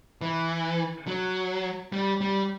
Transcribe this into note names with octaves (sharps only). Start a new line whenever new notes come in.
E3
F#3
G3
G3